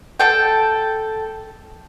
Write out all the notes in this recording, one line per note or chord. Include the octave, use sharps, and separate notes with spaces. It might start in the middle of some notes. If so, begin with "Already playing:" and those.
A4 G5